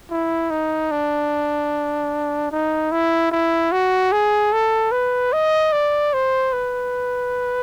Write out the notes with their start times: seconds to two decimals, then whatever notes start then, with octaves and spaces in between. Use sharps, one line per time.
0.11 E4
0.51 D#4
0.91 D4
2.52 D#4
2.92 E4
3.32 E4
3.72 F#4
4.12 G#4
4.53 A4
4.92 B4
5.33 D#5
5.73 D5
6.13 C5
6.53 B4